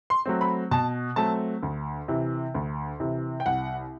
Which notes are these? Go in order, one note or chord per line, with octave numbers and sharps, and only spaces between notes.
C6
F#3 A3 C4
B5
B2 A5
F#3 A3 C4 A5
D2
C3 E3
D2
C3 E3
G5
C2 F#5